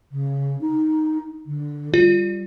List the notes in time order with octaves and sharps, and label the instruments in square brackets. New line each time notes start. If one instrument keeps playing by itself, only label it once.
[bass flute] C#3
D#4
D3
[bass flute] G3 [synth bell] F4